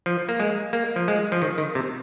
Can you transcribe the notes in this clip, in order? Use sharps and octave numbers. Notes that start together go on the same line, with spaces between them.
F3
A#3
G#3
A#3
F3
G#3
F3
D#3
D#3
C3